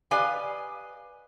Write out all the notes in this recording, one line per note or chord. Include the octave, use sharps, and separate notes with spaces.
G4 B4 D5 D#5 F5 G#5